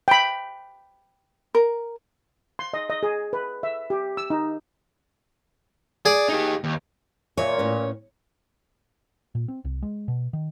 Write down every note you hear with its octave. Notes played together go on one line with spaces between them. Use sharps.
G5 B5
A#4
C6
D#5
D#5
G#4
B4
E5
G4
E6
D#4
G#4 D5
D#4 G4
D#2
A#2 C#5 E5 G#5
A2 C#4 B4
A#2
C4
C2
G#3
B2
D#3